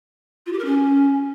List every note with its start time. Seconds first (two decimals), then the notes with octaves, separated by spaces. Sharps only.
0.46 F4
0.52 G4
0.59 A#4
0.65 C#4